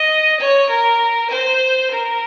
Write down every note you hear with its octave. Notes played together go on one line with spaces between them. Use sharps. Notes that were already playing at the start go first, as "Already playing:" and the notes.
Already playing: D#5
C#5
A#4
C5
A#4